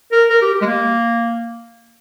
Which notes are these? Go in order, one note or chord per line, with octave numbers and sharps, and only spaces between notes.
A#4
A#4
G4
G4
G#3
A#3